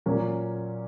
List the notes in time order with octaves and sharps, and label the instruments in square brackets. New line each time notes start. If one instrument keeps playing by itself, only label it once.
[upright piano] A#2 F#3 A#3 C#4